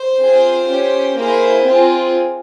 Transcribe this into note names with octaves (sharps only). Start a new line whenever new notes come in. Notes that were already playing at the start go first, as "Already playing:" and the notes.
Already playing: C5
C4 F4 G#4
C#4 G4
A#3 E4 G#4 C5
C4 F4 G#4